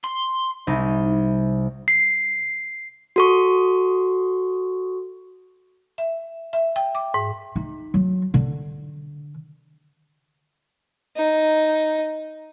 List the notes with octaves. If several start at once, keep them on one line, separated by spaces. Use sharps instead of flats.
C6
C2 D#4
C7
F#4 A4 C#6
E5
E5
G5
D6
G#2
D#4
F#3
D3
D#4